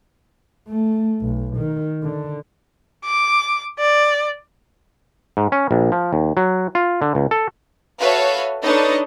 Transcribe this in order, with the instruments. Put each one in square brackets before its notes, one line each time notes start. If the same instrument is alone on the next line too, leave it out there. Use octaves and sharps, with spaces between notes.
[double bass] A3
B1
D#3
D3
[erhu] D6
D5
[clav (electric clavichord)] G#2
C#4
A#1
F3
D#2
F#3
F4
D3
C#2
A4
[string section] F#4 A4 B4 C#5 E5 F5
D4 D#4 A4 B4 C#5 D#5